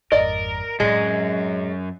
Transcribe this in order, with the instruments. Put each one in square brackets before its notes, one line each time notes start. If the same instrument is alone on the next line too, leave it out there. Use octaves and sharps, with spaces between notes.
[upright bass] G#1 F2 [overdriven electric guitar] A#4 [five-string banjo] D5 D#5
[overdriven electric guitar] F#2 [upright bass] A2 C4 [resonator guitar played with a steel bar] G#3